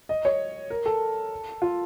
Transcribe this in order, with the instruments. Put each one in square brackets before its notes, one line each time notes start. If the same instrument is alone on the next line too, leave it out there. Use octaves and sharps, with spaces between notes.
[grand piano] D#5
C#5
A#4
A4
F4